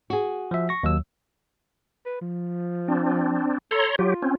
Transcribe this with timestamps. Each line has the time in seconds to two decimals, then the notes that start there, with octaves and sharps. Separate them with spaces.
0.10 F#4 G#4
0.51 F3 E5
0.69 C#6 A#6
0.83 D#2 F#3 E6
2.06 B4
2.21 F3
2.88 C4 D4
3.71 A4 C#5 A#5 C6
3.99 F#3 F4 G4
4.22 C4 C#4